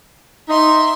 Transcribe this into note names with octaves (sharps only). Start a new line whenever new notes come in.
D#4 E5 C6